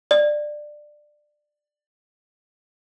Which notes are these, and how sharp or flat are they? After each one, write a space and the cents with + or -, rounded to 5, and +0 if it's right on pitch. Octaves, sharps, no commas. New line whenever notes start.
D5 +15